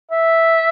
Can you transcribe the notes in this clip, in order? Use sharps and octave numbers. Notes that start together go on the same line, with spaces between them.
E5